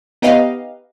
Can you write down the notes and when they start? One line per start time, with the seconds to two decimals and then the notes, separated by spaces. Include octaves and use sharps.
0.22 B3 D#4 G4 B4 D#5 F5